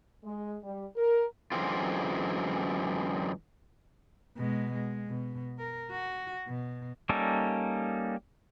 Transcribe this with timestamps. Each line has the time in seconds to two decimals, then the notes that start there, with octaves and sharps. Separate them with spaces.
0.25 G#3
0.63 G3
0.96 A#4
1.52 F#2 D3 E3 G#3 C4 F4
4.37 B2 G#3
4.73 G#3
5.08 B2
5.58 A#4
5.91 F#4
6.48 B2
7.09 G3 A#3 C#4 D#4 A4